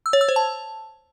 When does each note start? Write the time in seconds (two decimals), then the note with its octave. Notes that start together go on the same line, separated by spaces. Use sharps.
0.06 E6
0.13 C#5
0.21 E6
0.29 C5
0.36 A5